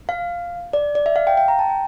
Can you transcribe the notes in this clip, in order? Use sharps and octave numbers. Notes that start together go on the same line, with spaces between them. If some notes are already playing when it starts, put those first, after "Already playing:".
F5
D5
D5
E5
F5
G5
G5
A#5
A5
G5